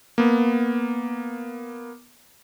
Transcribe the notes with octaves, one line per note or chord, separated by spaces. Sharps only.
A#3 B3